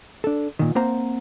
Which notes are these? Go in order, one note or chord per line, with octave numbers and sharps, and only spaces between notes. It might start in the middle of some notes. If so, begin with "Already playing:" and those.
D4 A4
A#2 D#3
A#3 C4 C5 F#5 A#5